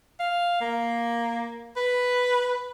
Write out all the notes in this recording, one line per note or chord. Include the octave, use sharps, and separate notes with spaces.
F5
A#3
B4